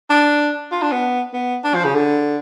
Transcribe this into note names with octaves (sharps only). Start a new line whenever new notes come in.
D4
F4
D4
B3
B3
D4
F3
C#3
D3